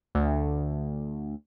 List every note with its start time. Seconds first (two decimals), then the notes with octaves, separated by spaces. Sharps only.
0.15 D2